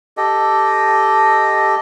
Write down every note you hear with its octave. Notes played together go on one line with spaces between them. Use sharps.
G4 A4 D#5